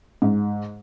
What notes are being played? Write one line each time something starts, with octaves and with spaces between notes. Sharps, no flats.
G#2